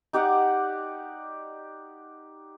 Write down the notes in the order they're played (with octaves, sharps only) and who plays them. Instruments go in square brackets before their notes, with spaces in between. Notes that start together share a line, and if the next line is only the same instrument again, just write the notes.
[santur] D#4 G4 D5 F#5